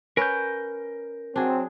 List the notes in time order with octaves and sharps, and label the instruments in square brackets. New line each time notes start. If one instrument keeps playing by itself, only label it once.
[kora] C#4 B4 [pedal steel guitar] A#4 G6
[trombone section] F#3 C4 [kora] D4 G#4